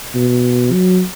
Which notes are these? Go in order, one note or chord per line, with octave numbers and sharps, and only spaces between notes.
B2
F#3